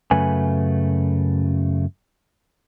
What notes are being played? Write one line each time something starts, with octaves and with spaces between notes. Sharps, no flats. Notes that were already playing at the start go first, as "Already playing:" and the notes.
F#2 C#3 A3 B4 G#5